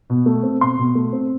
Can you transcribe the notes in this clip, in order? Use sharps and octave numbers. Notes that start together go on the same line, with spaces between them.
B2
A3
C4
B2 C6
B2
A3
C4